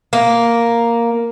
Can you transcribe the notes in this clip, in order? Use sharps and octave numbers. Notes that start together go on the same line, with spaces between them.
A#3